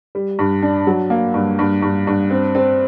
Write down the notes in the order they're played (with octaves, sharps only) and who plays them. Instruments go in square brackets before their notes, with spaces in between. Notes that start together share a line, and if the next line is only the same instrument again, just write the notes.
[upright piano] G3
G2
D4
F#3
A#3
G2
G2
G2
G2
C4
C4